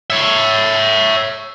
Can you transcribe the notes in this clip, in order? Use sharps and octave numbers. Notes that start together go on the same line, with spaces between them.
C#5 E5